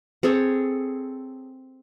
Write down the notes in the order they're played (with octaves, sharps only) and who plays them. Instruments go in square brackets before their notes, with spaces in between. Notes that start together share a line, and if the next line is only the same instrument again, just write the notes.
[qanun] C4 G#4 A4 C#5